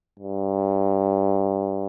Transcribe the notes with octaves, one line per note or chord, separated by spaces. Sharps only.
G2